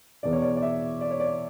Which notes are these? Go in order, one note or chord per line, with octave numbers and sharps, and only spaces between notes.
E2 B2 D5
C#5
D5
D5
E5
D5
C#5
D5